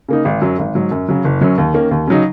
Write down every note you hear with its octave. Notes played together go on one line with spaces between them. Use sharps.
C#3 A#3 D#4
G#1
F#2 F#3
G#1
G#2 F#3
F#2
C#3 F#3
F#1
F#2 F#3 C#4
D#2
D#3 A#3 C#4
D#2
C#3 F#3 D#4